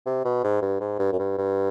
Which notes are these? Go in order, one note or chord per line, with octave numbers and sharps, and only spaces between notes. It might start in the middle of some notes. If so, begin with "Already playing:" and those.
C3
B2
G#2
G2
G#2
G2
F#2
G2
G2